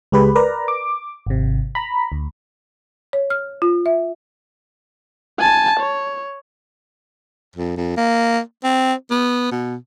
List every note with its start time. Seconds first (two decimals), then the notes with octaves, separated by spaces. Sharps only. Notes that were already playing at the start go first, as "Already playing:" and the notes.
0.12 C#2 G#3 G4 B4 B5
0.35 A#4 B4 D5 A#5
0.68 D6
1.27 G#1 C3
1.75 A#5 B5
2.12 D2
3.13 C#5
3.30 F6
3.62 F4
3.86 E5
5.40 G#5 A5
5.80 C#5
7.56 F2
7.77 F2
7.97 A#3
8.64 C4
9.10 B3
9.52 B2